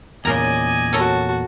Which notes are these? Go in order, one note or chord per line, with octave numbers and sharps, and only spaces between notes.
E2 A#2 C#3 A#4 D5 D#5 G#5 A#5
C#4 F#4 A4 A#4 A5